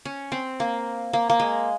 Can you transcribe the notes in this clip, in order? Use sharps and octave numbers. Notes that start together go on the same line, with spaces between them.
C#4
C4
A#3
A#3
A#3
G#3